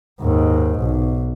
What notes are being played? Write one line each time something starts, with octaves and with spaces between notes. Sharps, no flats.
D#2 G#2
B1